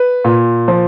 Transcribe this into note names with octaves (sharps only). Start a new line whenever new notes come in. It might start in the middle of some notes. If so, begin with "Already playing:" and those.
Already playing: B4
A#2
F3